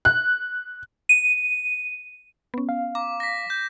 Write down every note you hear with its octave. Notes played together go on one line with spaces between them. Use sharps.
F#6
D#7
B3 C#4
F5
A#5 D6
A#6 B6
G6